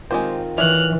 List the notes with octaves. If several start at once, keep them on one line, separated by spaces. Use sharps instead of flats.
D#3 G#3 C4 F4 G4 C5
E3 D4 C#5 E5 F6 F#6